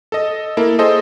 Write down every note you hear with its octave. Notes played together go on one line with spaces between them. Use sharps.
A4 D#5
A#3 E4 A4
G#4 A4 C5 D#5